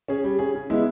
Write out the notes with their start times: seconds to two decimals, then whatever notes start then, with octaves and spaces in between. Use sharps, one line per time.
0.08 C#4 G#4
0.24 G3
0.39 C#4 G#4
0.55 C#3
0.70 G#3 B3 E4